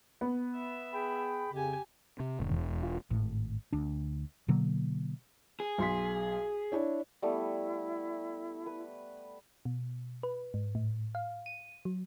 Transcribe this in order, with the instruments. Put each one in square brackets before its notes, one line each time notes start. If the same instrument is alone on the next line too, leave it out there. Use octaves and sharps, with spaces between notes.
[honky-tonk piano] B3
[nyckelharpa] E5
[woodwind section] G#4 G5 B5
[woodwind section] F2 C#3 [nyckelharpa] G4 G#5
[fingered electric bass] C3
[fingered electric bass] E1 [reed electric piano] G2 C3 D#3
[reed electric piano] E2
F4
[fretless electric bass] G#1 A2
D2 D4
B2 D3 F#3 A#3
[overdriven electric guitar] G#4
[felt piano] B1 C6 B6
D4 E4 C#5
[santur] G3 A3 B3 [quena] E4
[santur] B4
[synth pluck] B2
B4
G#2
A2
F5
D#7
F#3